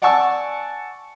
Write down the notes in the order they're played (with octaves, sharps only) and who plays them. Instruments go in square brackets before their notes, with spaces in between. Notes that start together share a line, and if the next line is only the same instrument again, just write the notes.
[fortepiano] D5 F#5 G#5 A5 C#6 E6